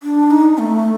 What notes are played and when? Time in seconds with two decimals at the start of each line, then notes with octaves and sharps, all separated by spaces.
0.03 D4
0.31 D#4
0.58 A3